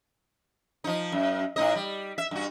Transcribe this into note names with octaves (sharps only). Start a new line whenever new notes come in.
F3 D#4
F#2
A2 D#4 D#5
G3
E5
G2 F#4